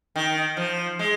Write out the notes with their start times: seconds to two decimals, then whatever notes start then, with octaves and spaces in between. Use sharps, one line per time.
0.16 D#3
0.57 F3
0.99 G#3